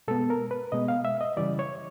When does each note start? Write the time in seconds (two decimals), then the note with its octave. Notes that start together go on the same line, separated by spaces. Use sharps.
0.08 B2 G#3 B3 A4
0.30 A#4
0.51 B4
0.72 B2 G#3 B3 D#5
0.88 F5
1.05 E5
1.21 D#5
1.37 C#3 E3 G3 D5
1.59 C#5